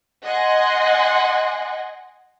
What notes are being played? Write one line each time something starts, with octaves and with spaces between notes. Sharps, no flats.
D#5 F#5 G#5 C6